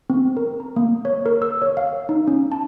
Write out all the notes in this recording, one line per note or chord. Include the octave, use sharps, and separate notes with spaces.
C4
A#4
A#5
A#3
C#5
A#4
E6
C#5
F5
D#4
C#4
A5